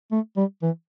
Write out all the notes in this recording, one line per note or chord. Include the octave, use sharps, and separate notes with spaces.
A3
G3
E3